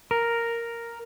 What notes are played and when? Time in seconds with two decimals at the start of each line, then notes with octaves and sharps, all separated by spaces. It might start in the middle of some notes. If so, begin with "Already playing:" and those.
0.11 A#4